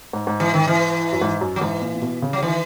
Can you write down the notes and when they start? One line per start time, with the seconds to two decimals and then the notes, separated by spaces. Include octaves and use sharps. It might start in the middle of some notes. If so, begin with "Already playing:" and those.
0.13 G#2
0.27 G#2
0.40 E3
0.54 D#3
0.68 E3
1.13 F#2
1.21 G#2
1.41 F#2
1.56 F#3
1.61 G#2 E3
1.81 A#2
1.95 A#2
2.02 B2
2.22 C#3
2.33 F#3
2.43 D#3 E3